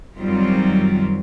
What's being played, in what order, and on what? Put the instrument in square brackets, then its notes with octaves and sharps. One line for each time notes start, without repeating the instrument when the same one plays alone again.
[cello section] F#2 D#3 F#3 G3 C4 F4